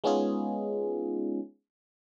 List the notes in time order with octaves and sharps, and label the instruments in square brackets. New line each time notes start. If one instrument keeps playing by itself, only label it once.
[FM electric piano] G#3 B3 C#4 D#4 F4 G#4